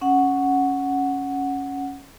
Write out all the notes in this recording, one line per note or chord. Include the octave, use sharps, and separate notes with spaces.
C#4 F#5